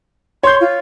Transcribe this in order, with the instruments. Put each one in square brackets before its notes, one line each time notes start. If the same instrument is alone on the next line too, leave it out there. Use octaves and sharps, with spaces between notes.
[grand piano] C#5 G6 [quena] C6
[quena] F4